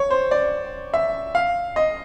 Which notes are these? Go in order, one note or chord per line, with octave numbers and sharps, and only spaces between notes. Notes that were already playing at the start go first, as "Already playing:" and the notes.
Already playing: C#5
C5
D5
E5
F5
D#5